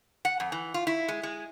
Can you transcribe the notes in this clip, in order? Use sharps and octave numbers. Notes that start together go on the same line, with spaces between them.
F#5
F2
E3
F4
E4
G#3
G#3